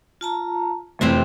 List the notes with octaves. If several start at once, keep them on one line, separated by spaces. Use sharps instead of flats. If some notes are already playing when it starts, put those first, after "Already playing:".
F4 A5 A#5
F2 C3 E3 A3 C4 E4 G4